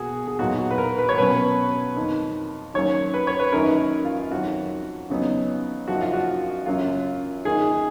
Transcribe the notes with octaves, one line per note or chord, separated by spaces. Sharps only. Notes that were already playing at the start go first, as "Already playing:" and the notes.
Already playing: B2 A#3 F#4 G#4
G#4
A#2 F#3 B3 D#4 F#4
F#4
B4
A#4
B4
C#5
B2 F#3 C#4 B4
F2 D#3 A#3 D#4
D#3 F#3 A#3 C#4 C#5
B4
C#5
B4
F#2 D#3 A#3 D#4 A#4
F4
F2 D#3 F#3 F#4
C#3 F#3 B3 D#4
F#2 C#3 F3 A#3 D#4 F#4
F4
F#4
F#2 C#3 F#3 A#3 F4
D#3 A#3 D#4 G#4